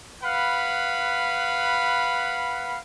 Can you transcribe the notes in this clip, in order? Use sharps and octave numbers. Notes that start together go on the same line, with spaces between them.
B4 F5 F#5 B5